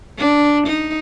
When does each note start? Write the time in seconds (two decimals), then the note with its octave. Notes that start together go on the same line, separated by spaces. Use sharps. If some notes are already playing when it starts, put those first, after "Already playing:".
0.18 D4
0.66 D#4